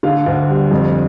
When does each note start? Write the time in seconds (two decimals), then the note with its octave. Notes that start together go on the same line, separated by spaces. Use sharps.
0.03 D3 F5
0.26 D2
0.49 G3
0.71 F2